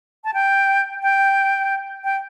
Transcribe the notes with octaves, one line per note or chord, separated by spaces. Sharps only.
A5
G5
G5
G5